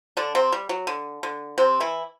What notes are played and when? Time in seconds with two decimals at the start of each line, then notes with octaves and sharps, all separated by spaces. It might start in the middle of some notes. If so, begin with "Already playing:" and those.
0.17 D3 D4
0.35 C3 C4
0.52 G3
0.69 F#3
0.87 D3
1.23 D3
1.58 C3 C4
1.80 E3 E4